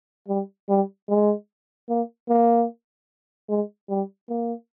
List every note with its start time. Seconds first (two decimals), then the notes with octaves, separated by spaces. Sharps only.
0.28 G3
0.69 G3
1.09 G#3
1.89 A#3
2.29 A#3
3.49 G#3
3.89 G3
4.29 A#3